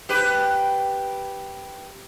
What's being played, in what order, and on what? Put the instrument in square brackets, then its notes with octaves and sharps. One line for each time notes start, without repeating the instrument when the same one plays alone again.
[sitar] G4 B4